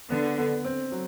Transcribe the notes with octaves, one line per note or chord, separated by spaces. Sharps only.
D3 B3
B3
C4
F#3